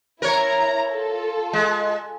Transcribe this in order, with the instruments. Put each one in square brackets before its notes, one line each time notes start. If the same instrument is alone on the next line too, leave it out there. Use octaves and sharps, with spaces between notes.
[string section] E4 A#5 [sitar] A#4 C#5
[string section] F4 A4
[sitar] G#3